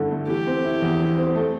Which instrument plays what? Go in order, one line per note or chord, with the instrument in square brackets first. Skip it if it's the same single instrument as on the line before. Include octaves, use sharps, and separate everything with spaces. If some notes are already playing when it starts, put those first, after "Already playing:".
Already playing: [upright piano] G2 D3 A3 E4
A3
[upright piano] E3 [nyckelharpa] G4
[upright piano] C4
E4
E2
E3
C4
A3